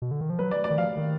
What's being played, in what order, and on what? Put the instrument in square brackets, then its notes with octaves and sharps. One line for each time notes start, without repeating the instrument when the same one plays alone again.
[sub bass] B2
D3
D#3
F3
[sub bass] F#3 [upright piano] B4
[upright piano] D5
D5
[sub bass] D#3
[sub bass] F3 [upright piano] F5
[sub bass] D#3